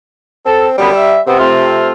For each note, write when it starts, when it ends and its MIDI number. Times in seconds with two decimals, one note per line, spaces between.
0.46 0.75 60
0.46 0.66 69
0.78 0.88 42
0.78 0.88 50
0.78 1.20 55
0.78 0.88 59
0.93 1.20 76
1.27 1.92 48
1.27 1.36 59
1.27 1.36 60
1.39 1.92 57
1.39 1.92 60
1.39 1.92 65